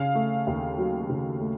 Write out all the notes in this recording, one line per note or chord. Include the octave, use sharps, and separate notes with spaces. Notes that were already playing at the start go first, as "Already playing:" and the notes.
Already playing: C#3 F5
A3
D#2
F#3
C#3
A3